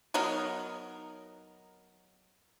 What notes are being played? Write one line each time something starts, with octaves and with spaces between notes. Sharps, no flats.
F#3 B3 D#4 A#4